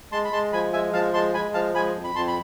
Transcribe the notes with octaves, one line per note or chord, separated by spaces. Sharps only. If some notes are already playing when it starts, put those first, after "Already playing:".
G#3 A5 C6
B5
G#3 A5 C6
F3 G#5 B5
G#3 E5 G#5
F3 F5 A5
G#3 A5 C6
G#3 G#5 B5
F3 F5 A5
G#3 G#5 B5
F2
B5
F2 A5 C6
B5